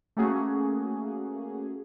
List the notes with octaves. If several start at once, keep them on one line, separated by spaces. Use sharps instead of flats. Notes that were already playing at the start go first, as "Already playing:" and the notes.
A3 A#3 C#4 F#4 G#4